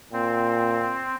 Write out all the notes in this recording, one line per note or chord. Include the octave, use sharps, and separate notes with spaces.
A#2 C4